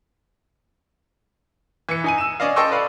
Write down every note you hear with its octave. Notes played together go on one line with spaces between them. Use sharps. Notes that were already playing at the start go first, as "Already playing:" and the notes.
E3 C#7
D#4 G#5 D#7
E6 E7
C#4 D5 D#5 F5
A4 D#5 G5 C6 C#6 E6
B4 D5 F5